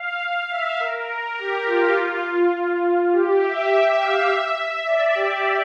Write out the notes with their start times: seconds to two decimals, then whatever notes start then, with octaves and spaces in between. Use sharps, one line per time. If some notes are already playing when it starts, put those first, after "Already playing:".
Already playing: F5
0.22 F5
0.50 E5
0.80 A#4
1.08 A#4
1.38 G4
1.67 F4
3.12 G4
3.41 E5
3.70 E5
3.99 F5
4.28 E5
4.57 E5
4.86 D5
5.15 G4